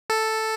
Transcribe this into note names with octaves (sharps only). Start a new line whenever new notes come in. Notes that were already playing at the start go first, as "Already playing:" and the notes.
A4